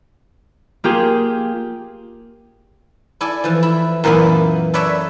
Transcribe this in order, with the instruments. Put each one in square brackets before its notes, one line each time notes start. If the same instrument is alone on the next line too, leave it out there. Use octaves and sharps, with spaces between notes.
[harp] A#3 F4 G4 G#4
[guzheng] E4 A4 D5 G#5
E3 F3
E4
F#2 A#2 E3 A#3 B3 F4
A4 B4 C#5 D5 E5